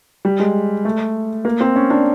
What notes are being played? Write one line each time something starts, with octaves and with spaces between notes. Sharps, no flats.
G3
G#3
A3
A#3
C4
C#4
D4